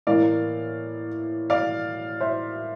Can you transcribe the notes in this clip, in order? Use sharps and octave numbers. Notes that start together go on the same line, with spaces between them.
A2 E3 A#3 D5 F5
D5 F5
C5 E5